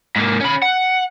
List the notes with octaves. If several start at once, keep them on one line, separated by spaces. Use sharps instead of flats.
G#2 A#3
C#4 B5
F#5